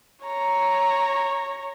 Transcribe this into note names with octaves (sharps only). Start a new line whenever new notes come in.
C#5 A#5